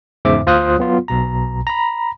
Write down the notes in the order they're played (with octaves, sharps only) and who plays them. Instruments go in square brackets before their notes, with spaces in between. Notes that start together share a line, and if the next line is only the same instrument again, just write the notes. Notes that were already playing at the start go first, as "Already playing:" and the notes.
[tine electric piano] E2 G#2 C#3 C5 E5 D6
D2 F4 C5 F5 D#6 F#6
F#3 B3 F4
B1 B2 A#5
A#5 B5